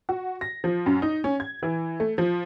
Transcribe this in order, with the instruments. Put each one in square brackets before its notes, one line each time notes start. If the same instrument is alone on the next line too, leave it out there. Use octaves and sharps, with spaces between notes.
[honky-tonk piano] F#4
A#6
F3
F#2
D#4
C#4
G#6
E3
A3
F3